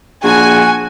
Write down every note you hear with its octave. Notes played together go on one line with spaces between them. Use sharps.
A#1 F#4 G#4 G#5